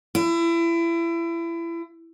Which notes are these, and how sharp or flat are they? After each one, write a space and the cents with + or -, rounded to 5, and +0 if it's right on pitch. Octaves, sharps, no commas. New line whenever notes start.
E4 +30